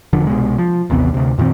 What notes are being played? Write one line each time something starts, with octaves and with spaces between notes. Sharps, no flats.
E1 D3 F3
C2 B2 G#3
F3
A1 D#2 C3 B3
D2 C3
F2 A#2 D#3 C4